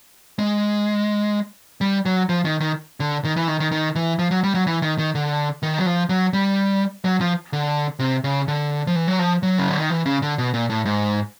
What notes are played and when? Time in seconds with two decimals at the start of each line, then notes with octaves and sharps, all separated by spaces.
0.39 G#3
1.81 G3
2.05 F#3
2.29 F3
2.45 D#3
2.60 D#3
3.00 D3
3.25 D#3
3.36 E3
3.48 D#3
3.60 D#3
3.71 D#3
3.95 E3
4.19 F3
4.31 F#3
4.44 G3
4.54 F#3
4.67 E3
4.82 D#3
4.98 D#3
5.15 D3
5.63 D#3
5.78 F#3
5.86 F3
6.09 F#3
6.33 G3
7.05 F#3
7.21 F3
7.53 D3
7.99 C3
8.24 C#3
8.48 D3
8.87 F3
8.95 E3
9.08 F#3
9.19 F3
9.43 F#3
9.58 C#3
9.69 D3
9.80 D#3
9.90 E3
10.06 C#3
10.22 D3
10.38 B2
10.54 A#2
10.70 A2
10.85 G#2